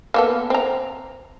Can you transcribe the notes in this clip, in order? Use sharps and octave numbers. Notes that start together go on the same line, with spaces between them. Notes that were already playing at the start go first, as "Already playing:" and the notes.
A#3 B3 A4
C4 A#5